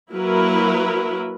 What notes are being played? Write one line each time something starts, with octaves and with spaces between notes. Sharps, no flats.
F#3 A#3 E4 A#4 B4